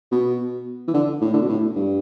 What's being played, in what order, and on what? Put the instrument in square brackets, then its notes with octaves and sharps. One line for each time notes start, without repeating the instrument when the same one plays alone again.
[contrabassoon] B2
E3
D3
A2
D3
B2
A2
G2